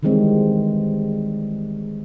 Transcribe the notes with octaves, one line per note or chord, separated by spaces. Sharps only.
D#3 E3 G3 G#3 C4